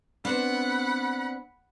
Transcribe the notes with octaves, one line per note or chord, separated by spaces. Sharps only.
B3 C4 D4 F#5 B5